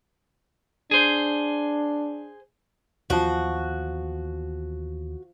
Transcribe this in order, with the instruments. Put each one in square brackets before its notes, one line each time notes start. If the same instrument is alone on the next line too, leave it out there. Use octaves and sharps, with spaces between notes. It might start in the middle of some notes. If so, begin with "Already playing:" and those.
[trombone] D4 [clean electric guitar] G#4 C5
[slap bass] D#2 E3 B3 [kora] F3 G5 [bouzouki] F#4